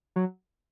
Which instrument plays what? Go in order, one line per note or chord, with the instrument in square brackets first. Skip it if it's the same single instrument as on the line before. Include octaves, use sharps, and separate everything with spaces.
[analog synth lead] F#3